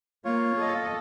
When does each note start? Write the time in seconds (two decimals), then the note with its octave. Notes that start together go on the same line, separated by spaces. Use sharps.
0.25 A#3 F4 C#5
0.57 A4 D#5